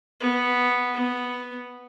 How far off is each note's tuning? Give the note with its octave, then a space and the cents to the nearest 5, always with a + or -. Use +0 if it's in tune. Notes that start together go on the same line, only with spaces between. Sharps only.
B3 -5
B3 +0